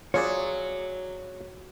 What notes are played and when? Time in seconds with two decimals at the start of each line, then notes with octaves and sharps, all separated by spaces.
0.14 F#3 F4 G#4 C#5 D5